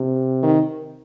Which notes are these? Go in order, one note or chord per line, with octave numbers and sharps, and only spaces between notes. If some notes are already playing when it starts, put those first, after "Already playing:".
Already playing: C3
D#3